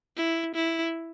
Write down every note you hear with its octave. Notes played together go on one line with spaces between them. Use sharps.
E4
E4